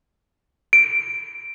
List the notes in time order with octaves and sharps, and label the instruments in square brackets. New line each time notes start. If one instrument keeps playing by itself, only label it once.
[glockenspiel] D7